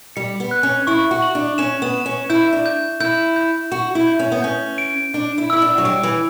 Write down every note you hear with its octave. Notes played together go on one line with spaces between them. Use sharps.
G3 C#7
B3
F#6
C#4
E4 C#6
F#4
F#7
D4
C#4 E7
B3
E7
C#4
E4 G6
D4
G6
E4 G6
G6
F#4 E7
E4
G6
C#4
B3
C#4 G6
D7
D4 D7
E4
E4 E6
D4
F#3
G3 D7
E3